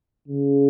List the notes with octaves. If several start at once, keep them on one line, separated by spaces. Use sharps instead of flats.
C#3